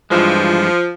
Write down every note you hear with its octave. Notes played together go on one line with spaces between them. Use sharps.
G2 E3 F3 G#3